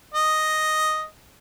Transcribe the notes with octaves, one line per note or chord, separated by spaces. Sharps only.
D#5